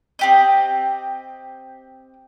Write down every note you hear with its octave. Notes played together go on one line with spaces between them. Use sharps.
C4 G4 D#5